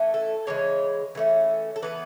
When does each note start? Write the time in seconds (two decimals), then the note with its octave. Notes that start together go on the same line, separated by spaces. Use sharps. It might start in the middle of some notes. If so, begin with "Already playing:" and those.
Already playing: E3 A3 C#4
0.14 A4
0.47 C#3 E3 G#3 C#5
1.15 E3 A3 C#4
1.76 A4
1.82 E3 B3 B4